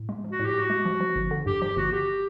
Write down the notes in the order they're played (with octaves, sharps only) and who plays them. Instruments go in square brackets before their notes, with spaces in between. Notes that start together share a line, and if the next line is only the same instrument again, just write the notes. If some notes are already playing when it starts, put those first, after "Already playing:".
Already playing: [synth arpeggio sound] A2
G#3
F3
[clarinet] F#4
[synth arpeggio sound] A2
[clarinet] G4
[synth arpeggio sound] A2
[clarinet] F#4
[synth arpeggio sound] G#3
F3
F3
G1
D3
[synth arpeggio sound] G2 [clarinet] G4
[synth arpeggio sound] F3 [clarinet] G4
[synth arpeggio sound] G1 [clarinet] F#4
[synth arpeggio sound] D3 [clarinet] G4